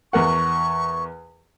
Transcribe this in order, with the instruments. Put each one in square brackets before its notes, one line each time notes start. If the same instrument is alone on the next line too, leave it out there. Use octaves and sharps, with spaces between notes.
[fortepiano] E2 A#4 F#5 [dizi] C#6